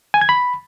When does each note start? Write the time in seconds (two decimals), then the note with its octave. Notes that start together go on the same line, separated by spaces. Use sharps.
0.14 G#5
0.21 G#6
0.29 B5